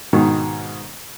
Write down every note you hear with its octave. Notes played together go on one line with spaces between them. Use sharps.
G#2 B2 D#3